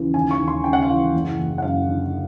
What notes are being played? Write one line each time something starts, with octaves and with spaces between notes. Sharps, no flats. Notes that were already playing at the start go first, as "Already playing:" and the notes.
Already playing: D#2 C#3 E3
D#2 G#5
C#6
D#2
C6
C#3 G5
F#5
F5
E3 F#5
F#1
F#1
F#5
F#2 F5
D3